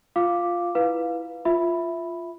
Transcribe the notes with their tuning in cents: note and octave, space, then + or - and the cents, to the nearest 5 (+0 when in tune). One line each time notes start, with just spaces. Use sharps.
F4 +0 F5 +0 D6 +0
E4 +0 B4 +0 F5 +10
F4 -5 E5 +0 B5 +0